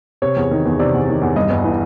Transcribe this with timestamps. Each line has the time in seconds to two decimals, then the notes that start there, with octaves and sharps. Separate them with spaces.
0.22 C3 C#5
0.36 E2
0.51 D#3
0.66 E2
0.79 C3 D5
0.94 E2
1.08 D#3
1.22 E2
1.36 G2 D#5
1.50 G1
1.64 E3